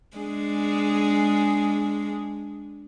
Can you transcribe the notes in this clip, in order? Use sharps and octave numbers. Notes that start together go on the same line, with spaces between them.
G#3 D4 G#4